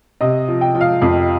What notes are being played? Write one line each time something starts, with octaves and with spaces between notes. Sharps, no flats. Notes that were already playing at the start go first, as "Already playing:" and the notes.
C3 D#5
F3
G5
F3
F5
F2